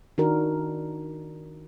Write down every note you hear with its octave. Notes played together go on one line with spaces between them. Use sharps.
D#3 D4 F#4 A#4